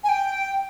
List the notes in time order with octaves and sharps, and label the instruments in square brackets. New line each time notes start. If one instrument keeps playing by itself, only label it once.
[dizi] G#5
G5